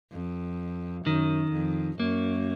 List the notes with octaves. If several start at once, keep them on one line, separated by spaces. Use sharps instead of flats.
F2
F#2 D#3
F2
F#2 A#3